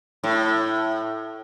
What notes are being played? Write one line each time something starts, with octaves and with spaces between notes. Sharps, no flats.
A2